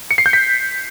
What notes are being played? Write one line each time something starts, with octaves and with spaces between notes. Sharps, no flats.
C#7
C7
G6
B6